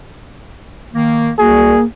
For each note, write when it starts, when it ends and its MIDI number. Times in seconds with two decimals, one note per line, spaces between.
0.94 1.30 51
0.94 1.30 58
1.39 1.74 36
1.39 1.85 58
1.39 1.74 66
1.39 1.83 68